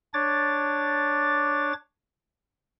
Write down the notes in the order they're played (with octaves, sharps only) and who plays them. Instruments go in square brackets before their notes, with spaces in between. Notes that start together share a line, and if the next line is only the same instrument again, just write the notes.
[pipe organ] D4 C#5 D6 A6